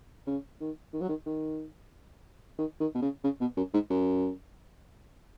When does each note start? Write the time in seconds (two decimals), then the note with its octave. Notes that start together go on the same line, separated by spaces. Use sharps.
0.27 C#3
0.60 D#3
0.93 D#3
1.01 F#3
1.09 D#3
1.26 D#3
2.58 D#3
2.80 D#3
2.95 B2
3.02 C#3
3.24 C#3
3.41 B2
3.57 F#2
3.74 G#2
3.90 F#2